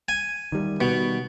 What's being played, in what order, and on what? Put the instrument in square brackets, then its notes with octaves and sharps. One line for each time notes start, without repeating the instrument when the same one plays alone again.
[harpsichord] G#5
[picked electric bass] D#3 G3
[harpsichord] B2